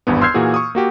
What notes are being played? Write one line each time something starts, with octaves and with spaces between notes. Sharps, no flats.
G#1 E2 G2 B3
C6 E6 F6 G6 G#6 C7
A#2 E3 A#3 F#4 G#4
C#6 D#6
A#3 F#4 G4